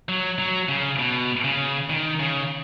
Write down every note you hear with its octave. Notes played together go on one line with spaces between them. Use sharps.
F#3
F#3
C#3
B2
C#3
D#3
C#3